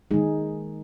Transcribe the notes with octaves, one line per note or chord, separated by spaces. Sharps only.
D#3 G#3 D#4 G#4